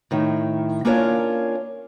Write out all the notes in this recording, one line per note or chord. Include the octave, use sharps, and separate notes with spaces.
A2 D#3
A#3 C#4 D4 F4 A#4 C#5